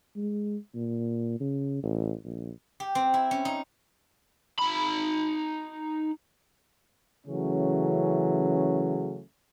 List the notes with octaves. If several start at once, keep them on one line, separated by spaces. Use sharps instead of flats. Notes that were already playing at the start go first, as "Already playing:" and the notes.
G#3
A#2
C#3
A1
A#1
G4
C4
E4
C#4
D#4
D#4 B5
C#3 E3 F#3 A3 C#4